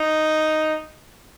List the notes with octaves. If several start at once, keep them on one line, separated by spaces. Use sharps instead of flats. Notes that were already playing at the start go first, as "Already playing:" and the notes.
Already playing: D#4